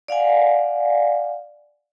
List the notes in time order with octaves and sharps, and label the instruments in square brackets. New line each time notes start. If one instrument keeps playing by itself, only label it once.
[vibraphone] D5 F5 F#5 G#5